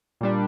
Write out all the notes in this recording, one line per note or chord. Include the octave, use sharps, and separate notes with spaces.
A#2 G3 D4